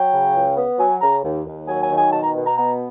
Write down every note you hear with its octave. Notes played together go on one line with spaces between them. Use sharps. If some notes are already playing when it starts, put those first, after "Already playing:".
Already playing: F#3 G5
C#3
C#2
B3
F#3 G#5
C#3 A#5
D#2
D#2
F#3 G#5
G#5
D#3
G#5
B2 A5
A#5
B2
A#5
B3 A#5